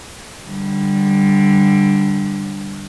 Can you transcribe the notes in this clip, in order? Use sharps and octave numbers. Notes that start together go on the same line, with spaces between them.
D3 G3